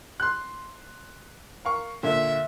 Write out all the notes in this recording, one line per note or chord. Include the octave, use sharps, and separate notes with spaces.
C6 F#6
A#4 F5 C#6
A#2 D3 E5